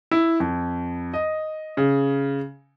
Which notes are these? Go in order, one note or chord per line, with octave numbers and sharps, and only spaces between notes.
E4
F2
D#5
C#3